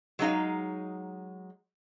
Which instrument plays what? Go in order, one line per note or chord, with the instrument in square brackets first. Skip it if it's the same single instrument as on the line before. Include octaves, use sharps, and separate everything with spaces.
[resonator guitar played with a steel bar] F#3 G#3 D#4 F5